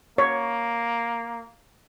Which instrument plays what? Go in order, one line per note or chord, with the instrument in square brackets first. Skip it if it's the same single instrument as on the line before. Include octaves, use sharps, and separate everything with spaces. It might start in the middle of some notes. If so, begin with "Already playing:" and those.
[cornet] A#3 [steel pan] C#5